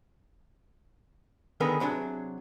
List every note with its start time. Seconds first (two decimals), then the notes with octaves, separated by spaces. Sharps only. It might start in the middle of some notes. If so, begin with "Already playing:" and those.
1.60 D3 D#3 B3 G#4 A#4 B4
1.80 C3 F#3 D4 G#4